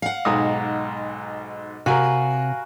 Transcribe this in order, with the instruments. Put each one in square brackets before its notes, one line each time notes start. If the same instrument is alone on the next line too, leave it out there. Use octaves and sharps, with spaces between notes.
[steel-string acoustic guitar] F5 F#5
[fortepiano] B1 G#2 D#6 [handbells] D#5 A#5
[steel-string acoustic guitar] C3 [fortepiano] F#4 A#4 [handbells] F5 G#5 B5